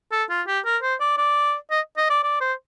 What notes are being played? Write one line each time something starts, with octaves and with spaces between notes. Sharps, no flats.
A4
F4
G4
A#4
C5
D5
D5
D#5
D#5
D5
D5
C5